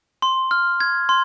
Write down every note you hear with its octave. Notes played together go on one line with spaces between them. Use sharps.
C6
F6
G#6
C6